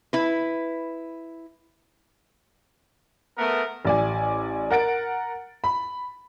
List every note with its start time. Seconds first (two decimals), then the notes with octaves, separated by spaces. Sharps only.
0.13 E4 B4
3.37 A3 B3 A#4
3.85 A1 D5 G#5
4.71 A#4 F#5 A6 D7
5.64 B5